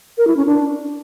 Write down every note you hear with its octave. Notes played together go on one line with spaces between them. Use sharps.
A#4
E4
C#4
D4